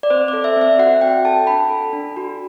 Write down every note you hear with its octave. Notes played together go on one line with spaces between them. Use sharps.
D5
C4 C5
A4 D5
E5
C4 E5
F#4 F#5
C4 G5
A4 A5
D4 B5
A4
D4
F#4